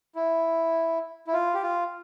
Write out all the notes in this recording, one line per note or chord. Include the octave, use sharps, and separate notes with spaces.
E4
E4
F4
G4
F4